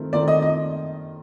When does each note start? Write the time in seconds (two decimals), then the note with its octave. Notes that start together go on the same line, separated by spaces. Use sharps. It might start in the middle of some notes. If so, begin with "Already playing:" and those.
Already playing: D#3 A3 C4 F4 A#4
0.13 D#3 A3 C4 F4 A#4 D5
0.28 D#5
0.42 D#5